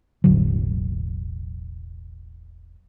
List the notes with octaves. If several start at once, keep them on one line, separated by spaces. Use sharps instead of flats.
E1 A1 D3 F#3